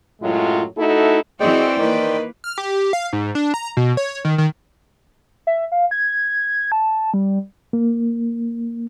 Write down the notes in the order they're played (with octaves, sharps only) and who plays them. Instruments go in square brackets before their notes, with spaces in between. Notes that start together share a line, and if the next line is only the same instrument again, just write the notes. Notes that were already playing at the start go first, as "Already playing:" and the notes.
[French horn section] F#2 A2 F#3 G#3 F4
A3 D#4 E4 F#4 A4
[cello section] E3 C4 F#4 [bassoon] G#3 [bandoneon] C5 D5 G5
[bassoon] D#3 [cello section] A#3 B4
[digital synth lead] F6
G4
F5
G#2
D4
A#5
B2
C#5
D#3
D#3
[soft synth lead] E5
F5
G#6
A5
G3
[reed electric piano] A#3